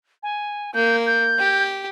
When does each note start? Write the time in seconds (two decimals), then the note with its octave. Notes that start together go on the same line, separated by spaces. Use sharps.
0.23 G#5
0.74 A#3 G6
1.06 G6
1.39 G4